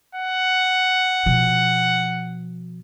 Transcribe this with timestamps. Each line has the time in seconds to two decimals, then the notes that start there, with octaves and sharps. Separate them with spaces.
0.15 F#5
1.26 B2 F3